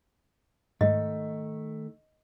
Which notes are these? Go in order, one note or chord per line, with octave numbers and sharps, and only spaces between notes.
G#2 D#3 A3 D#5